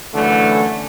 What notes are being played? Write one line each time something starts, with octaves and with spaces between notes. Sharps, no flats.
F#2 D3 E3 A3